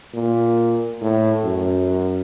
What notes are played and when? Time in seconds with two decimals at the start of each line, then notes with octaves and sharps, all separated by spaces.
0.14 A#2
1.01 A2
1.44 F#2